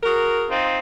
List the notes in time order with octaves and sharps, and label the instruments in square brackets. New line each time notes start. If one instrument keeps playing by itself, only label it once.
[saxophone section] F#4 G#4 A#4
[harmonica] C4 D#4 F4